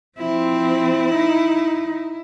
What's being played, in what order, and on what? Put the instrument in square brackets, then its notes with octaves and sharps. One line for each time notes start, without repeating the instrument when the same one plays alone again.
[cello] F3 C4 [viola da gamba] E4
[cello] D#4